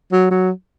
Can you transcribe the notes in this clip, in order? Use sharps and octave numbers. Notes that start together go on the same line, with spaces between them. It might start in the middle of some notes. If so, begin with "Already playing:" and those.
F#3
F#3